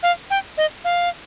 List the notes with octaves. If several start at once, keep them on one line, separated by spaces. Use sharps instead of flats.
F5
G5
D#5
F5